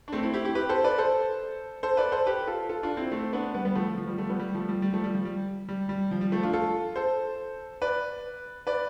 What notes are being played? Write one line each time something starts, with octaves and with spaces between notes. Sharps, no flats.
D4
A3 C4
C4 E4
E4 G4
E4 G4
G4 B4
A4 C5
B4 D5
A4 C5
A4 C5
B4 D5
A4 C5
G4 B4
F4 A4
F4 A4
D4 F4
C4 E4
A3 C4
B3 D4
G3 B3
G3 B3
F3 A3
F3
F3
G3
F3 A3
G3 B3
G3
F3 A3
G3
G3
F3 A3
G3
F3
G3
G3
G3
F3
G3
F3 A3
D4 F4
F4 A4
A4 C5
B4 D5
B4 D5